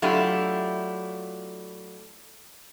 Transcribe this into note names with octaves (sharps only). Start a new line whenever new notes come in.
F#3 A3 D4 E4 F4 G4